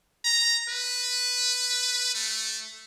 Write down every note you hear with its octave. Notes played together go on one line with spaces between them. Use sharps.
A#5
B4
A3